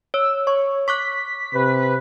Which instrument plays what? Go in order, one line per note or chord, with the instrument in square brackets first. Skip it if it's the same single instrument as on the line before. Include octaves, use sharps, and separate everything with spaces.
[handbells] C#5 [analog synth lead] E6
[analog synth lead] C#5 [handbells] C#6
[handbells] C#6 D6 F#6 [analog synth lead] B6
[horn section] C3 B4